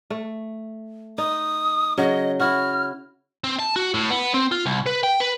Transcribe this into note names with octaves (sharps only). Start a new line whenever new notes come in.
A3
D#4 D#6
C#3 F#3 D#5
E4 F#4 F6
C4
A5
F#4
A2
B3
C4
F4
C2
B4
G5
B4